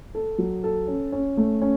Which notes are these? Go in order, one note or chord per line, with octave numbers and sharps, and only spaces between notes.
A4
F#3
A4
C#4
C#4
A3
C#4